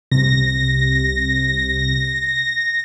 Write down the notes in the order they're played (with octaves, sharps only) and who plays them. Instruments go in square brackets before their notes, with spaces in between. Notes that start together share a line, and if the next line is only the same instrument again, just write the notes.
[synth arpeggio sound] C2 C3 [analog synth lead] A#6